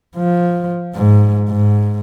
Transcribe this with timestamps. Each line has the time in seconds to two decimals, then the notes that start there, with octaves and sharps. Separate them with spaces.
0.16 F3
0.95 G#2
1.49 G#2